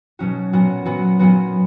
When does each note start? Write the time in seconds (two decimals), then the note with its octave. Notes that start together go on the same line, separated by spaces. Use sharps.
0.19 B2 F#3 C#4 F#4
0.53 A#2 F#3 B3 F#4
0.85 A#2 F#3 B3 F#4
1.19 A#2 F#3 B3 F#4